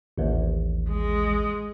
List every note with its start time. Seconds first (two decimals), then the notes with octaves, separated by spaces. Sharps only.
0.18 A1 D#2
0.89 G#3